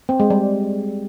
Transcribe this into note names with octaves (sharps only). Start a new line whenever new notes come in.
C4
G#3
G3